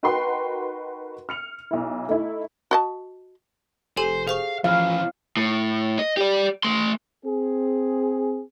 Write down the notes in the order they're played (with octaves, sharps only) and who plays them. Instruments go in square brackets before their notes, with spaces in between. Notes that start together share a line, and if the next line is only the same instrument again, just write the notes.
[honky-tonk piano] D#4 F#4 A#4 B4 G5 C6
F6 C#7 F7
B1 E4
A3 D#4 E4
[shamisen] F#4 D#5 A5
[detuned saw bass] F1 [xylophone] G4 A4 G#5 [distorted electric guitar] C5
[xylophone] G#4 C5 C#6 [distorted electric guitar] F5
[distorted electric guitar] E3 C#4 [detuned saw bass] F3 [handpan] F5
[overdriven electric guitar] A2
D#5
G4 D5
A3 C6
[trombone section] C4 G#4